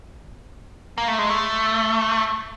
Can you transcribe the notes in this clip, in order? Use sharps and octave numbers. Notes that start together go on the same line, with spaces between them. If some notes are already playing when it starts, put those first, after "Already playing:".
A#3
A3
G#3
A3